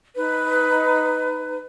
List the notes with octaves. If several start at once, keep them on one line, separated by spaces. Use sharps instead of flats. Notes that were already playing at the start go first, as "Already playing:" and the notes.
D#4 B4